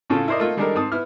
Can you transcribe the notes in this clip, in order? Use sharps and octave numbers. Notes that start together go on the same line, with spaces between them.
A2 C#3 C#4 F4 A4 A5
E4 A#4 C5 D5 D#5
A3 A#3 D#4 F4 A4
D#3 G3 G#3 D4 A4 A#4
G#2 C4 A5 D#6
B3 E4 F6